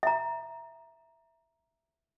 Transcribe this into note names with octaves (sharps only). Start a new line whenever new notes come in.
E5 A#5